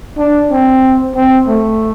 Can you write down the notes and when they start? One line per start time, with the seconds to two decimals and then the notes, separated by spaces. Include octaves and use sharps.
0.18 D4
0.51 C4
1.16 C4
1.48 A3